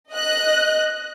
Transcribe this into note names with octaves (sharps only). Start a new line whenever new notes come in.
D#5 F#6